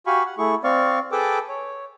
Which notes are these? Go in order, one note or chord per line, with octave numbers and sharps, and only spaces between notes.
F#4 G4 F5 G#5 B5 C#6
F#5
A3 E4 G#4 C#6
C4 D5 F5 C#6
G#4 A4 B4 G5 A5 D6
C#5